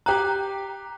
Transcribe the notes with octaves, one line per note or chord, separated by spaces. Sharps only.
G4 G5 A#5 F#6